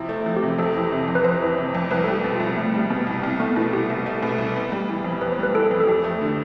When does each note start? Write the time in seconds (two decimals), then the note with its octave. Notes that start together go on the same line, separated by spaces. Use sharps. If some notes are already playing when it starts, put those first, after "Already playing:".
Already playing: C3 F3 E4
0.09 A3
0.26 F3
0.36 G4
0.42 C3
0.58 F2 A4
0.75 E3
0.92 C3
1.08 F2
1.15 B4
1.24 F2 C5
1.42 E3
1.58 C3
1.75 F2
1.91 C2 B4
2.04 G3 A4
2.13 G4
2.24 B2
2.35 F4
2.40 C2
2.57 C2 A3
2.74 G3
2.90 B2 B3
3.07 C2
3.23 C2 C4
3.40 A3 B3
3.56 B2 E4
3.73 C2 G4
3.90 C2
4.06 A3
4.22 B2
4.38 C2
4.56 B3
4.72 G3
4.89 E3
5.04 F2
5.21 B3 B4
5.32 C5
5.39 G3 B4
5.54 E3 A4
5.71 F2
5.80 A4
5.87 F2 G4
6.04 A3
6.21 D3